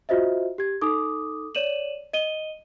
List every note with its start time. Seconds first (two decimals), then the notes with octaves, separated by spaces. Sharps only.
0.09 F4 F#4 C5 D#5 E5
0.58 G4 G#6
0.81 D#4 A4 D6 D#6
1.55 C#5 D5 D#7 E7 F#7
2.13 D#5 D#7 G7